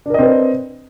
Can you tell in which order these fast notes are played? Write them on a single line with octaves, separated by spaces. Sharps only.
D4 A#4 D#5 C4 B4